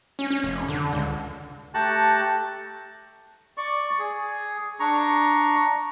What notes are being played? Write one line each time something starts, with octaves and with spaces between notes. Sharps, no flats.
C#4
C#4
F1
D3
C#2
A3 G4 A5 A#5 C#6 F#6
D5 C#6
G#4
D4 A#5 C#6